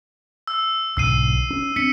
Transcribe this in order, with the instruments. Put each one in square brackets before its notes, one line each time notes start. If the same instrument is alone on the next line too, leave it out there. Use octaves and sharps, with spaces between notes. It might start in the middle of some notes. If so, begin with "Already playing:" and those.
[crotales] E6
[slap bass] B1 G#2 D3 [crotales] E6 C7 D#7
[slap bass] C#4
[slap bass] C4 D4 [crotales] B6 C#7